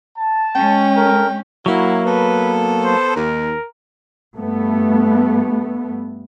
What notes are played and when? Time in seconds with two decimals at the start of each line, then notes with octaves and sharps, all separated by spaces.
0.18 A5
0.55 G#3 C#4 G5
0.97 A4 A#4
1.66 F#3 A#3 E4 F#4
2.05 B3 A4 B4
2.83 C5
3.16 D#2 A#4
4.35 G2 A3 B3